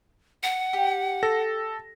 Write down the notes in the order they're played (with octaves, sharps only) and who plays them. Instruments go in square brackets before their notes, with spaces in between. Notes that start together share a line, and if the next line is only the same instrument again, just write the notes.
[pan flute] F#5
[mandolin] G4
[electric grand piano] A4 A#6